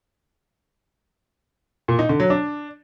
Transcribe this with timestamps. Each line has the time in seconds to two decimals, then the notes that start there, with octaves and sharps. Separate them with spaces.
1.88 A#2
1.99 D#4
2.09 D3
2.20 F#3
2.30 D4